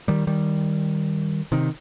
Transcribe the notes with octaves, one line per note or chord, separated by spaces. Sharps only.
D#3 G3
D#3 G3
C3 D#3